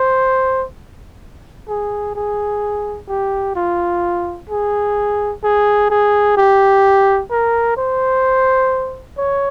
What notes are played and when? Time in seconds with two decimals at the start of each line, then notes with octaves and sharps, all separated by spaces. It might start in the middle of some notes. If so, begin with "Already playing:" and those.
Already playing: C5
1.68 G#4
2.15 G#4
3.09 G4
3.56 F4
4.49 G#4
5.43 G#4
5.90 G#4
6.37 G4
7.31 A#4
7.77 C5
9.18 C#5